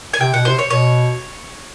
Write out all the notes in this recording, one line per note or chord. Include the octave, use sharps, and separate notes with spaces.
G#5
C3 G5
B2 F#5
C3 C5
C#5
B2 C#5